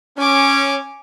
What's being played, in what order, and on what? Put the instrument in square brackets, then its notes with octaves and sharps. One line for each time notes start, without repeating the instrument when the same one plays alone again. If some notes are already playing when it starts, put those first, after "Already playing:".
[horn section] C#4 [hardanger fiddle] G#5 D6